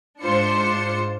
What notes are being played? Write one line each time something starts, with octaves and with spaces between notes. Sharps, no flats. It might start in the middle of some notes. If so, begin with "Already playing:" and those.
G#2 D4 F4 C5 C#7